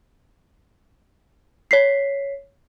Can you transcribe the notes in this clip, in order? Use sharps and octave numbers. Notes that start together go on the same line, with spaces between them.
C#5 B6 C7